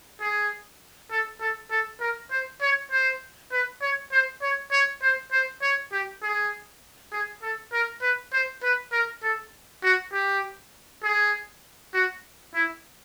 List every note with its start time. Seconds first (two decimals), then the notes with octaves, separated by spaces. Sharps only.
0.21 G#4
1.11 A4
1.40 A4
1.71 A4
2.01 A#4
2.31 C5
2.62 C#5
2.91 C5
3.52 B4
3.82 C#5
4.12 C5
4.42 C#5
4.72 C#5
5.02 C5
5.32 C5
5.62 C#5
5.92 G4
6.23 G#4
7.12 G#4
7.42 A4
7.73 A#4
8.02 B4
8.33 C5
8.63 B4
8.92 A#4
9.23 A4
9.83 F#4
10.12 G4
11.03 G#4
11.94 F#4
12.54 E4